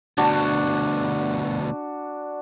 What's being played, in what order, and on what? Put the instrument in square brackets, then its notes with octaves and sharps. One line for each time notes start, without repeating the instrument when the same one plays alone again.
[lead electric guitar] D2 B2 [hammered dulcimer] D4 F#4